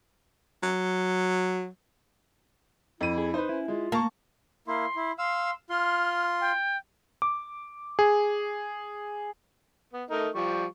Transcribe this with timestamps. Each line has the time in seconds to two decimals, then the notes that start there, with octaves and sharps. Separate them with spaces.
0.63 F#3
3.01 F2 E4 D#7
3.18 G#4
3.34 D#4 B4 C5
3.49 C#4 E4
3.68 G#3 F4
3.92 A#3 A5 C#6
4.68 A#3 E4 C6
4.96 E4
5.19 F5 C6 E6
5.70 F4 C6 F6
6.41 G5
7.22 D6
7.99 G#4
9.93 B3
10.11 A3 D#4 A#4
10.35 F3 G3 C#6